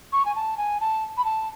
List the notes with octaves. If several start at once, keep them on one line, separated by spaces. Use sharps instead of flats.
C#6
G#5
A5
G#5
A5
B5
A5